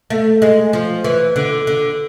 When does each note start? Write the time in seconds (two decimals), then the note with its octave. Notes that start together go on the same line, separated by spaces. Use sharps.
0.10 A3
0.42 G#3
0.73 F3
1.04 E3
1.36 D3
1.67 D3